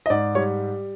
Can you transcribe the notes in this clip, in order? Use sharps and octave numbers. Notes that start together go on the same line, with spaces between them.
D#5
G#2 D5
G3 C#5